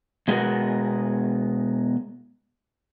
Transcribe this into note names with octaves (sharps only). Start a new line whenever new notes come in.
B2 G#3 A3 B3 F#4 A#4